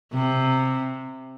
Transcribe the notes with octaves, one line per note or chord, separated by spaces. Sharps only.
C3